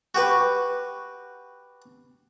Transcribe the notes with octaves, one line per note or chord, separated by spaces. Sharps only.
F#4 G4 B4